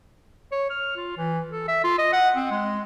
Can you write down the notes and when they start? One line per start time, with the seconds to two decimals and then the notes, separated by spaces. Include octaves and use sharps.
0.52 C#5
0.70 F6
0.96 F4
1.17 E3
1.51 A4
1.68 E5
1.84 F4
1.98 D#5
2.13 F#5
2.36 C4
2.51 G#3